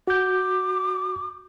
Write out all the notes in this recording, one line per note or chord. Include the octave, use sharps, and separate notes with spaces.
F#4 D6 G6